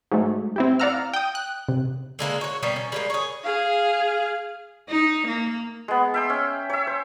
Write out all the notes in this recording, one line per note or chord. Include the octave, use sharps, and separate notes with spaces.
G#2 F#3 G#3 A3
C4 E4 G4
D5 F5 F#5 A#5 E6 F6
G5 D#6
F#6
C3
D3 G#3 A#3 B4
F#4 C#5
B2 G3 A#3 A#4
C#4
G3 G#3 A#3
G#4 C#5
G#4 F5
D#4
A#3
G#3 B3
E5 G5 C6
C#4
C#5 E5
C5